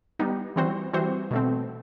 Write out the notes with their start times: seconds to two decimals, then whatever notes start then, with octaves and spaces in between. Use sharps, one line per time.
0.19 G3 B3 D#4
0.56 E3 G3 C4 F#4 C5
0.93 E3 G3 C4 F#4 C5
1.31 B2 A3 C4